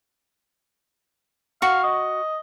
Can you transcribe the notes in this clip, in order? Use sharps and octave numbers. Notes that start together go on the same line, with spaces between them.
F#4 F5 C#6
D#5